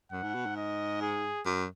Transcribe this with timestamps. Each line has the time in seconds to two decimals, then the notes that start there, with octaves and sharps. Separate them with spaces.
0.12 F#2 F#5
0.23 G#2
0.35 B2
0.46 G#2
0.56 D#5
1.02 G#4
1.46 F#2